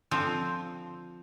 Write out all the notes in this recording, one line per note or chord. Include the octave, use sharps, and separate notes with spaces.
D3 F3 C4